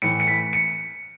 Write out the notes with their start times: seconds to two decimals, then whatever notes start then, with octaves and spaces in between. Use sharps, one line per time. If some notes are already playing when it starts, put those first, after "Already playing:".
0.02 A2 E3 C#7
0.20 C#7
0.28 B6
0.53 C#7